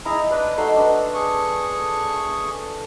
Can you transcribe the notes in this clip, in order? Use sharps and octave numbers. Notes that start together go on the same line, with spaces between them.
D#4 E4 G#4 A#5
D4 B4 B5
A3 D#4 F#4 C6
D4 B4
G#4 C#6